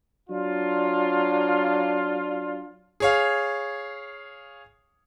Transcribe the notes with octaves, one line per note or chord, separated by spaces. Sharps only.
F#3 D4 F4
G#4 C#5 F5